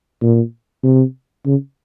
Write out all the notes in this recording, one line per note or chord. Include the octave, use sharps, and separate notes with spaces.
A#2
C3
C#3